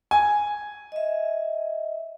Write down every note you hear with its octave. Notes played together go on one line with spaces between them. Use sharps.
G#5
D#5 E5